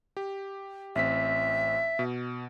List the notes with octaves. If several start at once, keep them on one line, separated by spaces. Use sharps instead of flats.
G4
A1 C4 E5 B6
B2